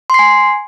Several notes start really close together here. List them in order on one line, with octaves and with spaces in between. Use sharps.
C6 C7 G#5